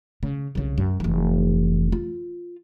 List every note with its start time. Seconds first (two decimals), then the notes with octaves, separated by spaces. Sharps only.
0.23 C#3
0.55 C2 C#3
0.78 F#2
1.00 F1 E3
1.92 F4